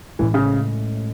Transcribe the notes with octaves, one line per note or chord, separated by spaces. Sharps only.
A2 E3 G#3 C#4
C#3